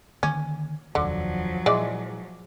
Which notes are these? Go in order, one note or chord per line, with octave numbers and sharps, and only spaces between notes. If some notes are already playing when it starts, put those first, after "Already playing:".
D3 D#3 A#3 C#4
F1 D#2 D3 F3 F#3
A#2 E3 G#3 D5